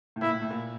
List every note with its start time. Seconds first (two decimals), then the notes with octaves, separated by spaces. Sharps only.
0.16 A2
0.22 A#2 E4
0.32 A2
0.42 A2
0.51 A#2